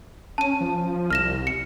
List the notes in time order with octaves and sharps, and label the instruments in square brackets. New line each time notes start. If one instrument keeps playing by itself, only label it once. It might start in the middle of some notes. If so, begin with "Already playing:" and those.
[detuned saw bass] C#4 [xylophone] A5 D#7
[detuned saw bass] F3
[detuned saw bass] C2 [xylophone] F6 A#6 E7
[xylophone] C#7